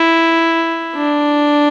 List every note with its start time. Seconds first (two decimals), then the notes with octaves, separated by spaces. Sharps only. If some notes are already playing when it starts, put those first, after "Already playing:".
Already playing: E4
0.96 D4